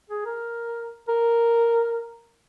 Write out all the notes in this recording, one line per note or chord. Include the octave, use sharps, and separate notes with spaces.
G#4
A#4
A#4